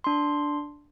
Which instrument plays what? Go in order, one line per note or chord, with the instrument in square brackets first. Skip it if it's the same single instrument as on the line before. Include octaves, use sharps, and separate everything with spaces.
[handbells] D4 C6